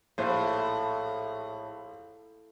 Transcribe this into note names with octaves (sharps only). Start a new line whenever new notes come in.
A#1 A2 C5